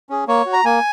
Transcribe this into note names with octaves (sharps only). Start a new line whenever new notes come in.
C#4 G#4
A#3 C#5
F#4
A#5
A#3 G#5